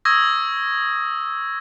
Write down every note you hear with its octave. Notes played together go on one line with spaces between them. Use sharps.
C#6 D#6 E6 G#6 A#6